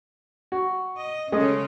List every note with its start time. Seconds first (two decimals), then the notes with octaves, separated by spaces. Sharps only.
0.52 F#4
0.96 D#5
1.32 C#3 G#3 A3 C#4 D#5